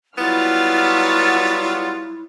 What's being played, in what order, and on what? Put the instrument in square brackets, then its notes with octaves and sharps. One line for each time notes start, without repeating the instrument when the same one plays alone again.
[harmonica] F#3 G3 F4 [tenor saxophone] B3 [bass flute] E4 [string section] F6 A6